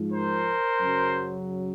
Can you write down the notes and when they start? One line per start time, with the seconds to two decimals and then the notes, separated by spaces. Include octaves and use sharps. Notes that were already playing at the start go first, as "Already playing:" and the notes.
Already playing: G#2 F3
0.11 A#4 C5
0.80 F#2 C#3 F#3